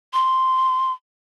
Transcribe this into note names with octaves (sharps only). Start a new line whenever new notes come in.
C6